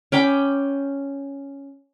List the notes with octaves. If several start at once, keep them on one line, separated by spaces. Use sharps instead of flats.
C#4 G5 B5 D6